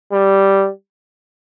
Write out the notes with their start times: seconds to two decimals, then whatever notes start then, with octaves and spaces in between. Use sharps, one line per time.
0.12 G3